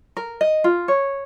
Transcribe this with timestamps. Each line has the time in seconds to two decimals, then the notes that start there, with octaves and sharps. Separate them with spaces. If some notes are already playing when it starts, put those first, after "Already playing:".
0.17 A#4
0.41 D#5
0.64 F4
0.88 C#5